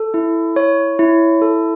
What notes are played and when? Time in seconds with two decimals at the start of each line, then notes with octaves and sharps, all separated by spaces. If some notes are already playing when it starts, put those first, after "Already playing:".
Already playing: A4
0.14 E4
0.56 C#5
0.99 E4
1.42 A4